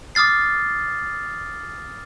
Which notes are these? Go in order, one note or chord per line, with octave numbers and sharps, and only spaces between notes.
D6 D#6 F6 A6 C7